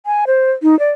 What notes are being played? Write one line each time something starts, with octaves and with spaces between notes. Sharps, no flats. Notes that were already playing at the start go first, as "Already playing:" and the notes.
G#5
C5
D#4
D5